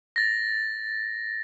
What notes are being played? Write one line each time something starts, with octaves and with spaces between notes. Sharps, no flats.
A6 A#6